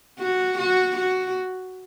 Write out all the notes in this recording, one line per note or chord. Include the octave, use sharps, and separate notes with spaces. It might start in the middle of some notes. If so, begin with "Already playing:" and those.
F#4
F#4
F#4